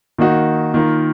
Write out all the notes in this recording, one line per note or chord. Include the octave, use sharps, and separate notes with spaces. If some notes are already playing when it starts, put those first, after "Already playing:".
D#3 A#3 D#4 F#4
D#3 A#3 F4